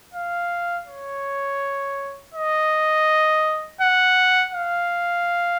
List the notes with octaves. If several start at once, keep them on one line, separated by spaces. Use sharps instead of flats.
F5
C#5
D#5
F#5
F5